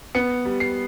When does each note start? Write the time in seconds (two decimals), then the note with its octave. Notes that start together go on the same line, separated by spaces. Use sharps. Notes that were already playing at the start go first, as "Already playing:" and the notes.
0.15 B3 C#7
0.45 G3
0.60 C7